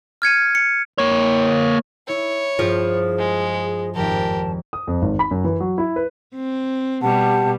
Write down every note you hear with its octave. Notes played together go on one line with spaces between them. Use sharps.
F6 G#6 C#7 D#7
C#7
A#3 C#5
E4 C#5 E6
G2 F3 G3 G#4 C5
G#3
G#1 F2 F3 G4 A#4 A5
D#6
F2
G#1
B5
F#2
E3
F#3
E4
B4
C4
B2 G3 G4 F#5 A5